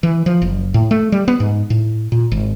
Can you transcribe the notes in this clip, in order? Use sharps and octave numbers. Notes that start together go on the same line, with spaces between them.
E3
F3
F#1
A2
A3
G3
B3
G#2
A2
A#2
G#1